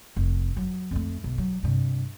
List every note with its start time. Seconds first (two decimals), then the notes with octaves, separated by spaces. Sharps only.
0.17 F1
0.56 F#3
0.91 F2 A3
1.24 B1
1.38 F#3
1.63 G2 C3